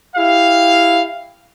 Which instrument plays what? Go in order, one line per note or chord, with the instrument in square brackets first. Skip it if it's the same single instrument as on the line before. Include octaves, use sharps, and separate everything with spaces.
[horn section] E4 G4 F5